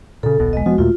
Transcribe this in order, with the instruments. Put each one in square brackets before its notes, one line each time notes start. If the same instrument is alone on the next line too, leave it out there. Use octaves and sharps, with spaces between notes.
[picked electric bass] A#2 C#3 [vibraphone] A4
[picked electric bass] D#1 B1 B2
[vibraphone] G#3 D#5
[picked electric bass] E1 F3 B3 [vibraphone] F#4
[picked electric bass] D#2 A#2 A3 [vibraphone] F4